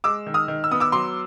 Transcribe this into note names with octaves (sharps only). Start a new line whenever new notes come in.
G#3 D6 E6
D#3
D#6 F6
D#3
E6
B3 D#6
D6 E6
F#3 C6 D6